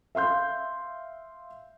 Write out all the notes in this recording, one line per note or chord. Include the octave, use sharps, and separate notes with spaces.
E5 F5 C6 G6